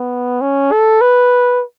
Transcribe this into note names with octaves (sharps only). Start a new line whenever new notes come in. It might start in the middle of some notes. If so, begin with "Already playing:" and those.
Already playing: B3
C#4
A4
B4